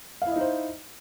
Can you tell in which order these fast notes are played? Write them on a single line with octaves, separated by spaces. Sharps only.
F5 E4 D#5 D#4 C5